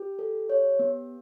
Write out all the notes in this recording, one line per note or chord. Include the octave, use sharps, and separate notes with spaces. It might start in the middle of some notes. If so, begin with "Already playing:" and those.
Already playing: G4
A4
C#5
B3